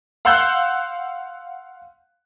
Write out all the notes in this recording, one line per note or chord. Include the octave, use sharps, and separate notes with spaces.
F5 F#5 C6 E6 F#6 G6